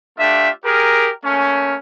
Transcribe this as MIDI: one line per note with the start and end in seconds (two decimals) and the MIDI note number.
0.19 0.49 57
0.19 0.49 62
0.19 0.49 65
0.19 0.49 67
0.19 0.49 76
0.65 1.10 67
0.65 1.10 68
0.65 1.10 70
1.25 1.77 57
1.25 1.77 58
1.25 1.77 61